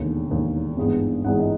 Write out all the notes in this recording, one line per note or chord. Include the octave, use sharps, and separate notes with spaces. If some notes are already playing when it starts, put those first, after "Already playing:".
Already playing: E1 D#2 D3
E1 D#2 D3
G#1 G2 E3 G#3 B3
G#1 G2 E3 G#3 B3 F#5
D#5